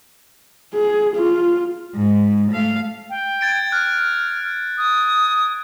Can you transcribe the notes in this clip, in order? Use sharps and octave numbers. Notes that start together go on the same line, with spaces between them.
G#4
F4
G#2
A3 F5
G5
G#6 A6 D7
F6 F#6
D#6